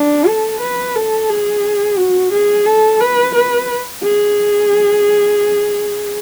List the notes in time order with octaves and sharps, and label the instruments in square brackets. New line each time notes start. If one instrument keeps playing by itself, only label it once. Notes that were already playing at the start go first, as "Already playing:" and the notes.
Already playing: [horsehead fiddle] D4
A4
B4
A4
G#4
F#4
G#4
A4
B4
B4
G#4